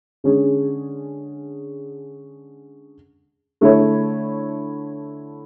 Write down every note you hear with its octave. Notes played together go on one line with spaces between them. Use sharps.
D3 G#3 C#4 G#4
D3 A3 E4 A4 C#5